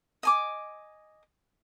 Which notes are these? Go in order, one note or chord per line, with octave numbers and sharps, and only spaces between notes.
D#5 G#5 D6